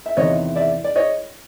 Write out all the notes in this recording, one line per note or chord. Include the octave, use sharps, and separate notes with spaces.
E5
E2 C3 D#3 C#5 D#5
D5 E5
D5
C#5 D#5